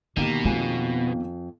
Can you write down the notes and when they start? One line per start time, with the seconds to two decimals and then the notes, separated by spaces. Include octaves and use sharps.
0.17 B2 D3 D#3 A#3 G4
0.45 F2 B3 G#5